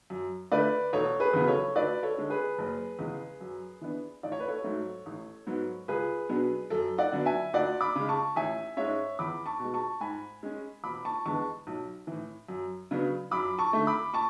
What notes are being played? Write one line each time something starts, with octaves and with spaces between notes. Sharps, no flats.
F#2
D3 A3 B4 D5
E1 A4 C#5
G#4 B4
E2 C#3 F#3 B3
A4 C#5
D2 B4 D5
A4 C#5
D3 G#3 D4
G#4 B4
F#1
E2 C#3 G#3
F#2
E3 B3 D4
A1 D5
C#5
B4
A4 C#5
G#2 F#3 A3
A1
G#2 F#3 B3
C#2 G#4 B4
B2 F#3 B3 D4
F#2 A4
D5 F#5
D3 F#3 B3 D4
E5 G#5
D2 D5 F#5
B5 D6
C#3 G#3
A5 C#6
A1 E5 G#5
G#2 G#3 C#4 C#5 E5
E2 B5 D6
A5 C#6
B2 G#3
A5 C#6
G#2 G#5 B5
G#3 C#4
E1 B5 D6
A5 C#6
E2 D3 G#3 B3 A5 C#6
B1
A2 E3
F#2
C#3 F#3 B3 D4
F#2 B5 D6
A5 C#6
D3 A3
B5 D6
A5 C#6